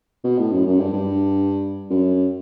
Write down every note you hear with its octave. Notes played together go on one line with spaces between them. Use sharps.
B2
A2
F#2
F#2
G2
G2
F#2